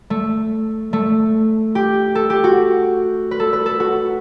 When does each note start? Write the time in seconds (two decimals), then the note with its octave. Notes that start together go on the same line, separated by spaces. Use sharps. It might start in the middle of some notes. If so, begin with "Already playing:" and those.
0.10 A3
0.93 A3
1.75 G4
2.15 A4
2.30 G4
2.44 F#4
3.31 B4
3.40 A4
3.53 B4
3.66 A4
3.80 F#4